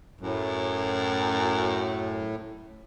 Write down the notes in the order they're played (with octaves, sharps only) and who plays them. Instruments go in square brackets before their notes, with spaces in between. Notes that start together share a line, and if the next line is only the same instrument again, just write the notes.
[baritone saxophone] F#2 [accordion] A2